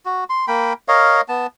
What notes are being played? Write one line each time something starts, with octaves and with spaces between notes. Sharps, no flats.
F#4
C6
A#3 G5 B5
A#4 C#5 D#5 F5
B3 A5